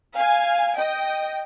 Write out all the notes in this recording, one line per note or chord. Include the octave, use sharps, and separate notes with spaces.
F5 G#5
D#5 G5